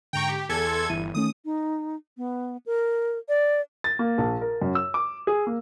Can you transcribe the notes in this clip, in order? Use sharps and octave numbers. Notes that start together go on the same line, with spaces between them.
G#2 D3 G5 A#5 C#6
G4
E2 A4 G#5 G#6
C6
G1 E3 E4 D#7
D#3 A3 C#4 D#6
D#4
B3
A#4
D5
A6
A#3
A#1
A#4
F#2
E6
D6
G#4
A#3